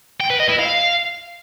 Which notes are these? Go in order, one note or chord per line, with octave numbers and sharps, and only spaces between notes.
G5
B4
D#5
E4
F5